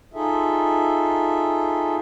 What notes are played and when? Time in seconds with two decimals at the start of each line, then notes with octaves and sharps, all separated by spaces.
0.14 D#4 F4 G#4 A4 E5